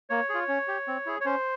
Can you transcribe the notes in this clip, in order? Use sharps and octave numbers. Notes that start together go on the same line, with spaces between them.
A#3 C#5
F4 G#4
C#4
G4
C4
E4 G#4
C#5
C#4 C5